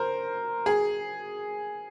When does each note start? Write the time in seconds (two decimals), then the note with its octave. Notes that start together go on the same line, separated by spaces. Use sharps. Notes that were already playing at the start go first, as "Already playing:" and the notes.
Already playing: A#4 C5
0.66 G#4